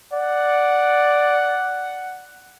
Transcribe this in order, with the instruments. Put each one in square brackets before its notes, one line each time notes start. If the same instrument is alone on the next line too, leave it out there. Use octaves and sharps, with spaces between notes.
[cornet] D5 [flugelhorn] F#5